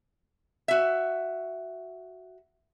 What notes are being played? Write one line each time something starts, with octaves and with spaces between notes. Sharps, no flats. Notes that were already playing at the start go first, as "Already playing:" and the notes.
F#4 E5